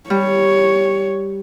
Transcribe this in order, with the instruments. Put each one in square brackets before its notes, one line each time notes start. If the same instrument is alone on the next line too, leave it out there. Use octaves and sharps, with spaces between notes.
[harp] G3 [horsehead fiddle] C#5